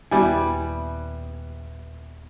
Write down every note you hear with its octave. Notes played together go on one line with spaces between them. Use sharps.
D#1 G3 B3 E4 G#5